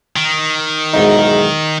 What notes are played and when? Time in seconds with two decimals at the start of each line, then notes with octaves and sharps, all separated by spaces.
0.16 D#3
0.94 B1 E2 G#2 D#4